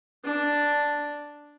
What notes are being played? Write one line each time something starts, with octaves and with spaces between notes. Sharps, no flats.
D4